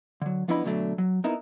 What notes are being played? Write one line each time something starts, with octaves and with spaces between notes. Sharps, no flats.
D3 F#3
F3 B3 D4 E4 D#5 B5
D2 B2 F#3 A3 D4
F#3
B3 D#4 E4 A#4